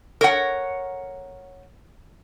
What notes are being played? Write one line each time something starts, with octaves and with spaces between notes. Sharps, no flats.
A#4 C#5 F#5